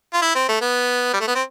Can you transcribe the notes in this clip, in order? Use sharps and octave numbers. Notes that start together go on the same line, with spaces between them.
F4
E4
C4
A3
B3
G3
A3
B3
C4